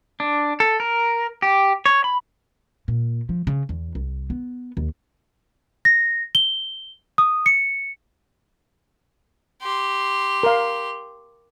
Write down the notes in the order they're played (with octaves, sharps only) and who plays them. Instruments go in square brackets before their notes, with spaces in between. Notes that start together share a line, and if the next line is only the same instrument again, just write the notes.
[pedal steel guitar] D4
A4
A#4
G4
C#5
B5
[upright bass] A#2
F3
C#3
E2
C2
B3
D#2
[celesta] A#6
G7
D#6
C#7
[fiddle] G4 C6
[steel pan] A#4 F5